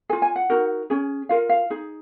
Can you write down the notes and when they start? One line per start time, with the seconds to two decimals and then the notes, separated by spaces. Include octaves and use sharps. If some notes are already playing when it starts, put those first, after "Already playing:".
0.09 G#4 G#5
0.13 F4
0.22 G#5
0.36 F#5
0.50 D#4 F#4 A#4
0.90 C#4 G#4
1.29 F4 A#4 F5
1.49 F5
1.70 D#4 G#4